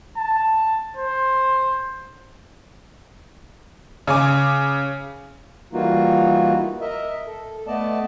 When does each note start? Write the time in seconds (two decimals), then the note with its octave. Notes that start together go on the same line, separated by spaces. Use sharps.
0.17 A5
0.97 C5
4.07 C#3 G#5 D6
5.73 E3 G3 A#3 D#4 F4 F#4
6.81 A#4 D#5 E5
7.27 A4
7.67 A3 B3 D5 D#5 A5